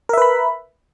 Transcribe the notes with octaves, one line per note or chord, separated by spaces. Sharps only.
A#4 B4 E5 B5